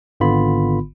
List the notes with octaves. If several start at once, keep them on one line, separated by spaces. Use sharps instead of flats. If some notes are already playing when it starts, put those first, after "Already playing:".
G#1 D3 B3 F4 B5